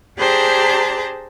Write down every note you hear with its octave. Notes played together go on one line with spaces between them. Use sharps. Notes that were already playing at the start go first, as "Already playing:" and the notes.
D4 G4 G#4 C5 A5 A#5